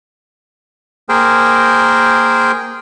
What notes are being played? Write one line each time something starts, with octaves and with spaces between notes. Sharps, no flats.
A#3 G#4 A#4 C5 G5